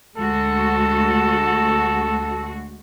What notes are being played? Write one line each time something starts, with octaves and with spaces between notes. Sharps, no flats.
D2 G#3 F#4 A4